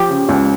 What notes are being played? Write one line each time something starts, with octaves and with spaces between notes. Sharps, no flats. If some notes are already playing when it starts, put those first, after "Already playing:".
Already playing: F3 G4
C#3
C#2